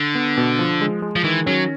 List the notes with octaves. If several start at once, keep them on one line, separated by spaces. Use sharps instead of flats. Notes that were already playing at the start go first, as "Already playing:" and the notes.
Already playing: D3
B3
B2
F3
G#3
G#3
F3
D#3 E3
F#3 C#4